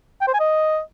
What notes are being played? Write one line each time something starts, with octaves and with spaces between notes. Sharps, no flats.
G5
C5
G#5
D#5